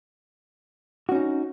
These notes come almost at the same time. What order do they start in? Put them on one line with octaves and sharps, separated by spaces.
F#4 C#4 D#4